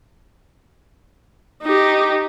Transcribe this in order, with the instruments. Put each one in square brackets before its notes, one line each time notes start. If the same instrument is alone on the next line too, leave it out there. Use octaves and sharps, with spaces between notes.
[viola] D#4 G4